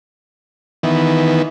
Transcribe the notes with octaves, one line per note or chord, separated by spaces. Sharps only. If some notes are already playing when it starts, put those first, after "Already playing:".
D#3 E3 B3